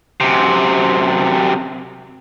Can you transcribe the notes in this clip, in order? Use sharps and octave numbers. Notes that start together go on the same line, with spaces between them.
F#2 C3